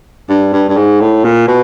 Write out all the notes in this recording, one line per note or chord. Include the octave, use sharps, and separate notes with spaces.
G2
G2
G2
G#2
A2
A#2
B2